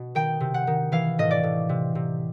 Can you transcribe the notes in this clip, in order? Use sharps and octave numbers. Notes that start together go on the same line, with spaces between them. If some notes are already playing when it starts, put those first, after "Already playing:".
Already playing: B2
D#3 G5
C3
F#5
D#3
E3 F5
A2 D#5
D5
A2
C3
C3